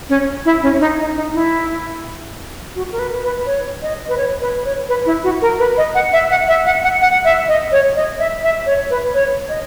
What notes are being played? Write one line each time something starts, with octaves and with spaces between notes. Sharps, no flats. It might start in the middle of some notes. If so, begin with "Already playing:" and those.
C#4
E4
C#4
D#4
D#4
D#4
E4
F#4
A#4
B4
B4
C#5
D#5
B4
C#5
B4
C#5
B4
E4
F#4
A#4
B4
D#5
F#5
E5
F#5
E5
F#5
F#5
F#5
E5
D#5
C#5
D#5
E5
E5
C#5
B4
C#5
D#5